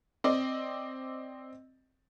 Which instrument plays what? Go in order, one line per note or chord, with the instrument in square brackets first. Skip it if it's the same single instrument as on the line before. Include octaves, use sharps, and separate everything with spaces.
[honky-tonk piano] C4 D5 D#5